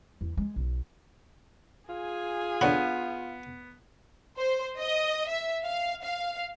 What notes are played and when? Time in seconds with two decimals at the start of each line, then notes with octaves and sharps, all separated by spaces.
0.21 E2
0.37 G#3
0.56 B1
1.89 F4 G#4 G#5
2.61 D3 B3 C#5 B5
4.37 C5
4.78 D#5
5.28 E5
5.63 F5
6.02 F5